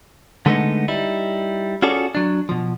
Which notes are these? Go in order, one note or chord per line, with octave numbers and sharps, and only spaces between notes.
D3 G#3 A3 B3 D4 D#4
G3 D#4 E4
C#4 F4 F#4 G#4 A4 D5
F#3 D4
B2 F3